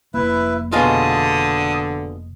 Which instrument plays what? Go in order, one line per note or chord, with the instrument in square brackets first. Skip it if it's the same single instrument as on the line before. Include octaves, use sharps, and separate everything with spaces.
[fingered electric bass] F1 A#3 [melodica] E4 B4 E5
[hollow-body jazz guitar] B2 G#3 F4 [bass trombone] D3 [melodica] A5 D#6